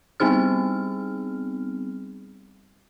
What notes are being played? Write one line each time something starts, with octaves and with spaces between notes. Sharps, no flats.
G3 B3 C4 D#4 G#4 F6